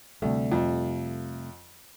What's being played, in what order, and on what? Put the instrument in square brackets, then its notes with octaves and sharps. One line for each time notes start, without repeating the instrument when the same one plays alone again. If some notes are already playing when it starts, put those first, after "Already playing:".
[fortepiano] D2 [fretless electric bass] C3 G3 A3
[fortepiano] F2